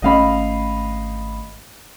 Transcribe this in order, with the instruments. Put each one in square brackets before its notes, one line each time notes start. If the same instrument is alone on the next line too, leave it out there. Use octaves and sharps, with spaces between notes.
[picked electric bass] G#1 A3 C#4 [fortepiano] D#5 F5 B5